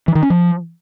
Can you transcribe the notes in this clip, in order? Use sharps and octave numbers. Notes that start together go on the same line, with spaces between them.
E3
D#3
C#4
F3